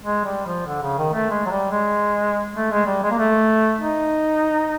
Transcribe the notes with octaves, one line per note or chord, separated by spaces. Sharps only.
G#3
G3
F3
D3
C#3
D#3
A3
G#3
F#3
G3
G#3
A3
G#3
G3
G#3
A#3
A3
D#4